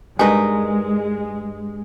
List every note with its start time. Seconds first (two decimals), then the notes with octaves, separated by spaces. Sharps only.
0.19 G2 G#3 D#4 A#4 B4 G#5